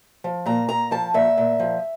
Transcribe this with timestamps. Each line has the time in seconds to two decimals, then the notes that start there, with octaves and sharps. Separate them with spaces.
0.24 F3
0.46 A#2 A#5
0.69 A#2 A#5
0.91 F3 A5
1.14 A#2 E5
1.37 A#2
1.60 F3